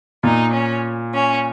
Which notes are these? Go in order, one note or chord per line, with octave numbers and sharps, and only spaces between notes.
A#2 D#4
C#4
C#4